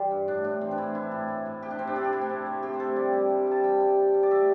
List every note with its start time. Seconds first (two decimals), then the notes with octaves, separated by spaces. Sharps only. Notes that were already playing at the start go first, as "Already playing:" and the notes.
Already playing: E3 G3 G4 C5 D5
0.11 G2
0.28 A2 D4
0.44 A2 D4
0.61 E3 C4
0.71 D4
0.78 A2 E4
0.95 E3 E4
1.12 A2
1.28 A2
1.46 A2
1.62 C3 G4
1.71 D4
1.79 C3 C4
1.87 D4
1.96 C3 A4
2.04 G4
2.13 A3 E4
2.21 C4
2.29 C3
2.46 A3
2.63 C3 G4
2.73 C5
2.80 A3 A4
2.96 G3 D5
3.13 G3
3.30 G3
3.47 G3 A5
3.63 G3 G5
3.80 G3
3.97 G3
4.14 G3
4.23 D5
4.31 A3 E5